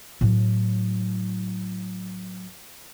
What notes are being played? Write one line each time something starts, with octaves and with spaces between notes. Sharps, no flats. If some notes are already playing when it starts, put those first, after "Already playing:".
A2 F#3